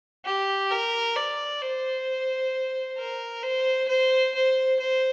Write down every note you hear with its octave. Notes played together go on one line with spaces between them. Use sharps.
G4
A#4
D5
C5
A#4
C5
C5
C5
C5